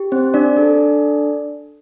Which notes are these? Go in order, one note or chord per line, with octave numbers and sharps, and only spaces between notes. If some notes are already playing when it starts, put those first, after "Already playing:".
Already playing: G4
C4 C5
D4 D5
D4 A4